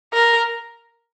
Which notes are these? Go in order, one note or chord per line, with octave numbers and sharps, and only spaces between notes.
A#4